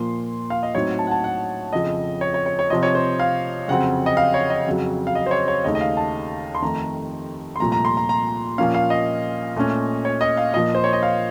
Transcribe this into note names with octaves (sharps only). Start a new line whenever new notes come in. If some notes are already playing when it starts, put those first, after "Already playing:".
Already playing: A#2 F3 A#3 C6
F5
D#5
A2 F#3 C4 D#4 C#5
A5
F#5
A5
F#5
F2 C#3 F3 D#5
C#5
C#5
C#5
C#5
C3 F3 C4 D#5
C#5
C5
F5
F2 C#3 F#3 C4 F#5
D#5
F5
C#5
D#5
F2 C#3 F#3
F5
D#5
C5
C#5
C#5
D#2 C#3 A3 D#4 D#5
D#5
F5
A5
C6
F2 D#3 A3 D#4 A#5
C6
C2 A#2 F3 A3 A#5
A#5
C6
A#5
A#5
A#2 F3 A#3 C#4 F5
F5
D#5
A#2 A3 C#4
C#5
D#5
F5
A#2 F3 A#3 D#5
C5
C#5
D#5
F5